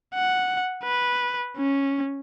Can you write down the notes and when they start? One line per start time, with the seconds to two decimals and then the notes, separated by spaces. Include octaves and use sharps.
0.15 F#5
0.83 B4
1.57 C#4